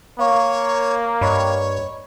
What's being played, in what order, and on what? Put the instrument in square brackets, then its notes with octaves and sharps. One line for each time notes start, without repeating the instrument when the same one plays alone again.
[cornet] A#3 [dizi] C#5 [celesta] F5 C#6
[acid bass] G2 [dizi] C#5 [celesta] D#5 B5 C#6